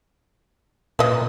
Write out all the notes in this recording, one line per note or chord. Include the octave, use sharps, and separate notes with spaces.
A#2 B4 D#5